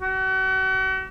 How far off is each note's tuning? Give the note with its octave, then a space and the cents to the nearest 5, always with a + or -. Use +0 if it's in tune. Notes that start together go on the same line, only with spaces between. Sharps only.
F#4 +40